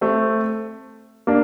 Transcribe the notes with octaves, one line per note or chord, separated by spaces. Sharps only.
A3 C4
A#3 D4